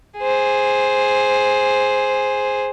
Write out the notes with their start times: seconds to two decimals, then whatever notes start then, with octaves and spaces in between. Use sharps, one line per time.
0.19 G#4 C5